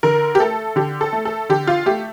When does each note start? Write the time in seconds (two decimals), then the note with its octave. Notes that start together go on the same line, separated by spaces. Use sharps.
0.03 D3 A#4
0.35 G4
0.40 A3 A4
0.76 D3 G4
1.01 A4
1.13 A3
1.25 A4
1.49 D3 G4
1.67 F4
1.86 A3 G4